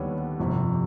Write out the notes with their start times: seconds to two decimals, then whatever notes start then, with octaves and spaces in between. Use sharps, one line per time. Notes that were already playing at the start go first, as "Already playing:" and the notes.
Already playing: D#2 D3 G3 B3 D4 B4 C#5
0.39 G1 F2 C3